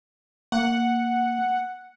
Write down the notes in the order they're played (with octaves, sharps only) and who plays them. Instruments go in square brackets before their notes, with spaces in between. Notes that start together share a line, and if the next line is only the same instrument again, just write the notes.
[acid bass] A#3 [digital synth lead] F#5